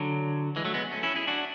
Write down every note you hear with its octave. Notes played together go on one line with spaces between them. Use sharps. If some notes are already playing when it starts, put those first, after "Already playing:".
Already playing: D3 F#3
E3 G#3
F#3 A3
G#3 B3
A3 C#4
C#4 E4
E4 G#4
D4 F#4